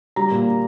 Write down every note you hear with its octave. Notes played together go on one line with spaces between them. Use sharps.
G3 A#5
A#2